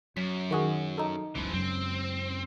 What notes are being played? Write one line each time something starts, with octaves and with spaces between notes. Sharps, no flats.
F#2 F#3 B6
D#3 F#4 G#4
D#4 A4
F#1 C#2 C#3 E3 F3
F#2 C#3 G#3 C4